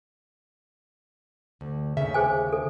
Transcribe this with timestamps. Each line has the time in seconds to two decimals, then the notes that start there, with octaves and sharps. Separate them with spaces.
1.61 D2
1.97 D#2 C#3 E5
2.14 G#4 C5 G#5
2.53 A4